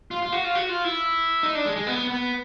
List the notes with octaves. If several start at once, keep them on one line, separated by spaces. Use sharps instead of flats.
F4
F4
F#4
F4
F#4
F4
E4
D#4
D4
G#3
G#3
B3
B3